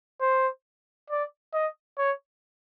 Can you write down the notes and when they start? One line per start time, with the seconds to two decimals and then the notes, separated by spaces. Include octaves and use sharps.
0.21 C5
1.10 D5
1.54 D#5
1.98 C#5